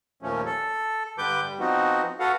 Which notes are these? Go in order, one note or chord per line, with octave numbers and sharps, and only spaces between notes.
D#2 A#2 F3 A3 C#4
A4
G2 D3 G3 B4 D6 G6
G3
F3 B3 C4 D#4 F#4
F#4 A4 B4 F5 F#5